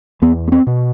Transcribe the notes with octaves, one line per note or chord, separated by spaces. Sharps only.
E2 B3
B3
C4
B2